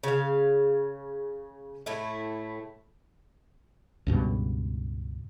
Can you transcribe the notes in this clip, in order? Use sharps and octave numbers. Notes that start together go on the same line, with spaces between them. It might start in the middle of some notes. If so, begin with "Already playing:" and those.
C#3 F5
A2 A3 E4
C#2 G2 B2